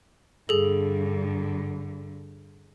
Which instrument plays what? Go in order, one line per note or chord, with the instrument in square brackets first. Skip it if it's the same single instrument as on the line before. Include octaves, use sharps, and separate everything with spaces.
[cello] G2 D3 [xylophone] G#4 A4